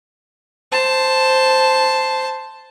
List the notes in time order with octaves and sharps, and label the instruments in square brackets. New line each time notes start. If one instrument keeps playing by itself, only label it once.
[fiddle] C5 A5